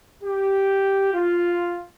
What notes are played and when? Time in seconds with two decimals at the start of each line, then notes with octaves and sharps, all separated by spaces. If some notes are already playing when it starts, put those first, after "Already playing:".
0.23 G4
1.14 F4